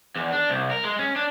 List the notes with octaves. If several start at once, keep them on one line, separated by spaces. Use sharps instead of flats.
E2
D4
C2
A#4
G#3
C#4
D4